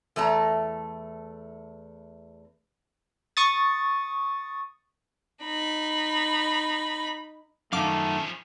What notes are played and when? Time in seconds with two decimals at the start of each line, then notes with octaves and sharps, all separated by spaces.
0.16 E2 A3 A5 A#5
3.37 C#6 D#6 A6
5.45 D#4 B5
7.73 F#2 D#3 F3 A3 C#4 F5 D6